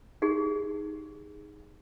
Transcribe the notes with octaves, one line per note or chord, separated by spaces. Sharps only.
D#4 G4 G#4